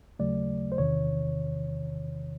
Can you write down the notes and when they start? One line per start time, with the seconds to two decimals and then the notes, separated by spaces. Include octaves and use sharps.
0.19 D#2 C#3 F#3 A3 D5
0.72 C5
0.78 E2 C3 D#3 C#5